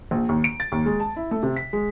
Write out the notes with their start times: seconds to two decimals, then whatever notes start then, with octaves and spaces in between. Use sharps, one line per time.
0.11 A#1
0.29 D#2
0.44 D7
0.60 A6
0.72 D#2
0.86 G#3
1.00 A5
1.16 E4
1.31 A3
1.43 C3
1.56 B6
1.73 G#3